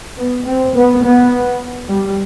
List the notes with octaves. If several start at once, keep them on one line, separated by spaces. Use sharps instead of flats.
B3
C4
B3
B3
G3